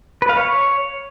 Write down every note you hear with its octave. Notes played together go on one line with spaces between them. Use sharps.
B4
F5
C#5